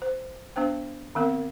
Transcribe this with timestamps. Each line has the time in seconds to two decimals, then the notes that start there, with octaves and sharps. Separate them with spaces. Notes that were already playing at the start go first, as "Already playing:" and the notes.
0.02 C5
0.56 B3 D4 C5 G5
1.15 D#3 B3 C4 A#4